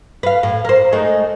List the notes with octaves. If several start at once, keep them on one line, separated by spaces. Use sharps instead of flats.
B4 F5
A2
A#4 C5
G#3 A3 D#4